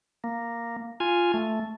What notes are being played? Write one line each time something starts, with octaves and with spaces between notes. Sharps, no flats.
A#3
F4 G#5
A3